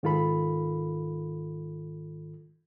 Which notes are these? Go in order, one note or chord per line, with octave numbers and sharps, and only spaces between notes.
G#2 D#3 F4 A4 B5